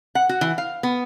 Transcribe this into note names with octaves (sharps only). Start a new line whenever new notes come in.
F#5
F#4
E3
F5
B3